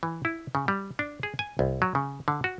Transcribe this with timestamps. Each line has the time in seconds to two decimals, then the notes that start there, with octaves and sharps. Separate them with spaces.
0.03 E3
0.25 E4
0.55 C#3
0.68 G3
0.99 D4
1.23 G#4
1.39 G#5
1.59 C2
1.82 F#3
1.95 C#3
2.28 D3
2.44 F#4